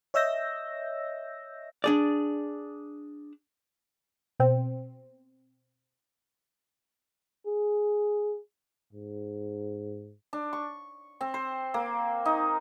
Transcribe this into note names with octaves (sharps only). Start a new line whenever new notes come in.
C#5 D#5 E5 E6 G6 A#6
D4 G#4 D5
B2 C4
G#4
G#2
D4
C#6
C4
C5
A#3
D#4